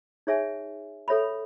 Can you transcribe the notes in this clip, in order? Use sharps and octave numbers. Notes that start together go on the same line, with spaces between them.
D#4 G#4 C#5 E5 G#5
A4 C#5 E5 B5